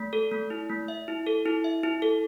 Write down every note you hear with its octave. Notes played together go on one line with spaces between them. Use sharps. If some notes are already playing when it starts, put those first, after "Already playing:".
Already playing: A3
A4
A3
E4
A3
E5
E4
A4
E4
E5
E4
A4